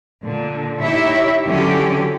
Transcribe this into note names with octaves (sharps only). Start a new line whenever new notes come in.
A#2 D3
D#4 E4 G4 C#5 E5
D3 E3 F#3 C#4 G4